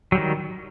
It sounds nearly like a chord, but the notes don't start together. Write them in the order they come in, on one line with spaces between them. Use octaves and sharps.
F#3 G3 D#3